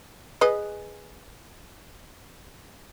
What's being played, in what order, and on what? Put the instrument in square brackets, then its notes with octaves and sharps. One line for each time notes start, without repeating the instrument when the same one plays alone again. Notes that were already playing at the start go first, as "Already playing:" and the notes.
[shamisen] G#4 B4 D#5